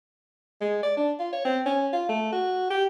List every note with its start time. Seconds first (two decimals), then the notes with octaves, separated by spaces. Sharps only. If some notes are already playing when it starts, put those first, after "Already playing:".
0.61 G#3
0.83 D5
0.97 D4
1.19 F4
1.32 C#5
1.45 C4
1.66 C#4
1.93 F4
2.09 A3
2.32 F#4
2.70 G4